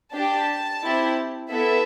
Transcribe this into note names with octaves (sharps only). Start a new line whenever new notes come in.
D4 G4 A5
C4 E4 G4
B3 E4 A4 E5